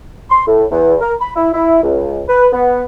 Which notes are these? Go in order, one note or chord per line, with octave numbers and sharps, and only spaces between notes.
C6
A2
E2
A#4
B5
E4
E4
C#2
B4
B3